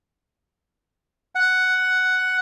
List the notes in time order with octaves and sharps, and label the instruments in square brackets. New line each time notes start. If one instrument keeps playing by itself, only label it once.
[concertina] F#5